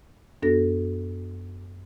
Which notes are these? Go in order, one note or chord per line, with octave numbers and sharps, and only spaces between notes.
F#2 B3 D4 F#4 A4 A#6